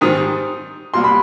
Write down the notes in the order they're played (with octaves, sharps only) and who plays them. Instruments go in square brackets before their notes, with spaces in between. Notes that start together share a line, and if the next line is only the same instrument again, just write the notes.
[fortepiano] G#2 D#3 G3 C4 [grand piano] D#6
[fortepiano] C2 B2 G3 A#3 [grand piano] C6
[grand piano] B5